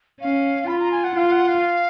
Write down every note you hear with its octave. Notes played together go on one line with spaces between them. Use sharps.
C#4 F5
F4 B5
A#5
G#5
F#5
F4 F5
F#5
F5